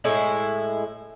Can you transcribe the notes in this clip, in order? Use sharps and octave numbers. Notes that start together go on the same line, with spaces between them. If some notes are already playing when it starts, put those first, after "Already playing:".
A2 G#3 E4